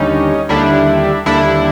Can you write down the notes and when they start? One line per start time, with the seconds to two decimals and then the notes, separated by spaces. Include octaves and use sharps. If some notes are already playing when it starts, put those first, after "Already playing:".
Already playing: D#2 D3 G3 C#4 D#4
0.49 D#2 D3 G3 D4 E4
1.26 D#2 D3 G3 D4 E4